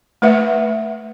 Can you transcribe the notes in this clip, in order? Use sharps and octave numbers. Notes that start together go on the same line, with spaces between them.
A3 B4 E5 F#5